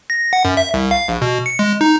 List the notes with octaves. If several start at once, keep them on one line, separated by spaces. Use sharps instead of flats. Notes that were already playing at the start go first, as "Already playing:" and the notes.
A#6
F#5
F#2
E5
C2
F5
A#1
B2
C#7
G#3
D#4